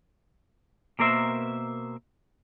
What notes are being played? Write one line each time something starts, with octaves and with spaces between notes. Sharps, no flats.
B2 A#3 A#4 C5 E5